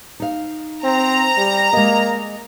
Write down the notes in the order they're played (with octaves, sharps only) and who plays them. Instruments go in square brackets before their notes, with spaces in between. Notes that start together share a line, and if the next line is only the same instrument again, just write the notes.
[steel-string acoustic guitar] D#4 F5
[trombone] C4 [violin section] A#5
[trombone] G3
[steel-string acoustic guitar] G#3 D#5 [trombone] A#3